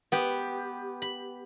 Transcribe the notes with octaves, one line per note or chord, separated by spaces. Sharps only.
B3 G4
B5